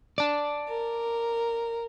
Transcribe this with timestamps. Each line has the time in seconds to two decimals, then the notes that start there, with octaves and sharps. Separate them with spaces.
0.18 D5 A5
0.68 A#4